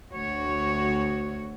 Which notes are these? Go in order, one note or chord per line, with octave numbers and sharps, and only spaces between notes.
D2 F#4 C#5